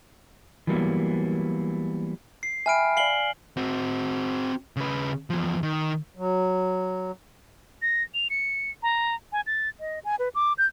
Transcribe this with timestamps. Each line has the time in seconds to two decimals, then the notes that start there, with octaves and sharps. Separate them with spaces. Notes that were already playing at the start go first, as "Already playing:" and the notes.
0.67 E3 F#3 G3 A#3 B3
2.43 C7
2.66 E5 G5 G#5 B5 F6 D7
2.97 D5 F5 C7 F#7 G7
3.57 C4 F#4
4.77 C#3 B4
5.30 E2 F3
5.63 D#3
6.17 F#3
7.82 A#6
8.14 F7
8.30 C#7
8.83 A#5
9.32 G#5
9.46 A6
9.80 D#5
10.05 G#5
10.19 B4
10.35 D6
10.58 G6